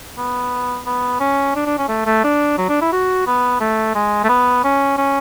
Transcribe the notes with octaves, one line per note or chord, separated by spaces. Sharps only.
B3
B3
C#4
D4
D4
C#4
A3
A3
D4
F#3
D4
E4
F#4
B3
A3
G#3
A3
B3
C#4
C#4